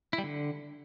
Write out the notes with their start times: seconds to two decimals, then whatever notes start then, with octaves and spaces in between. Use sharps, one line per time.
0.13 E4
0.18 G3
0.24 D3